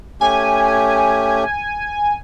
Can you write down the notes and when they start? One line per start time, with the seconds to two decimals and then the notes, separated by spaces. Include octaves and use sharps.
0.21 A3 C#4 G4 G#5